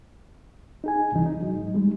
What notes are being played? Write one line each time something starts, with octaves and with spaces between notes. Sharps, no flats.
D#4 G#4 G#5
C#2 G2 C3 E3 D#4
D#4
F#3
G#2
G3 G#3 D#4